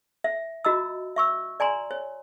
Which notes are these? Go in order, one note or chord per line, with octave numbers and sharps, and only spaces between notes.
E5
F4 F#4 D#5 A#5 E6
E5 C#6 E6
D5 G#5 A#5 C6
C#5